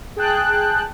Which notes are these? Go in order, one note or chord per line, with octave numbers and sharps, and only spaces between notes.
G#4 G5 A5 F#6